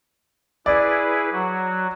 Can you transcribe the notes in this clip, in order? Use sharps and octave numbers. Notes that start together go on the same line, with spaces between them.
E4 G#4 B4 D5
F#3 F#4